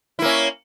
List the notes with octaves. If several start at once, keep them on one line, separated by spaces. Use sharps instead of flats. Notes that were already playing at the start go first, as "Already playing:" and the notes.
A#3 C#4 E4